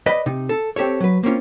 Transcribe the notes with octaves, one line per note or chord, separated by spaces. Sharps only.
B4 D5 D#5
C3 D#4
A4
C4 G4 A4 C#5
F#3 B4
A#3 C4 C#4 F4